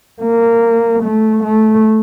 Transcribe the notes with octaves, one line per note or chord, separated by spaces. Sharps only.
A#3
A3
A3